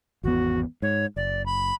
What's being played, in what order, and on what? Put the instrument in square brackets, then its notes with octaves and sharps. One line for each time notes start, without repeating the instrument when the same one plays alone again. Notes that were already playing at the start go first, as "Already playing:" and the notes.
[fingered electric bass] G#1 E2 B3 [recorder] F#4
[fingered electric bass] G#2 [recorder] C#5
[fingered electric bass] F#1 [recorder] D5
[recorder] B5